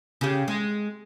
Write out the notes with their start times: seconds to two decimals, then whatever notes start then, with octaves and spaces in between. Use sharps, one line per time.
0.21 C#3 G4
0.48 G#3